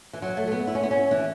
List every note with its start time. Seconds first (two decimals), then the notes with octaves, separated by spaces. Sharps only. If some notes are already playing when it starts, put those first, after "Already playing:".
0.13 E3
0.22 F#3
0.37 A3
0.47 A3
0.52 B3
0.67 E4
0.75 C#4
0.83 B3
0.91 C#4
1.11 E3